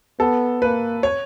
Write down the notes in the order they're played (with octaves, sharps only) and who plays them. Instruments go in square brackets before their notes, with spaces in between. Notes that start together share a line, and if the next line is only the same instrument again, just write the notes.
[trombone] B3 [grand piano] A4
[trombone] A#3 [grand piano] B4
[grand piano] C#5